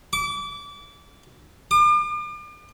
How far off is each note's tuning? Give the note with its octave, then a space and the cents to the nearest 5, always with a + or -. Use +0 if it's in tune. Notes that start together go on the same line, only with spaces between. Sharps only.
D6 -30
D6 +40